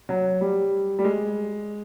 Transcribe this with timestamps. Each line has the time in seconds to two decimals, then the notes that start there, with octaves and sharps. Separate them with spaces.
0.09 F#3
0.41 G3
0.99 G3
1.05 G#3